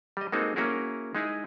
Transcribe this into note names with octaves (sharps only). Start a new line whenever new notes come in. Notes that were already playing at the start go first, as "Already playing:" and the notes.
G3 D#5
G#3 A#3 C4 D#4 F#4 A4
A#3 C#4 E4 F#4 G#4 A#4
G#3 D#4 E4 G#4